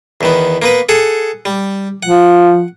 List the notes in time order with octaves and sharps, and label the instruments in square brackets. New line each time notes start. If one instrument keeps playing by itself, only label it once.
[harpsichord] E2 D#3 B3
A#3 B3 B4
G#4 A4 F#5
G3
[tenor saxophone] F3 [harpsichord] F#5